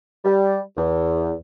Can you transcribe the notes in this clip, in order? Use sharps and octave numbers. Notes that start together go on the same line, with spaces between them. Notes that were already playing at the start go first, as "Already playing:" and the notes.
G3
E2